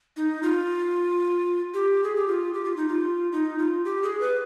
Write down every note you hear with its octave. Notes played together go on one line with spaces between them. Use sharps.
D#4
F4
G4
G#4
G4
F4
G4
F4
D#4
F4
D#4
F4
G4
G#4
B4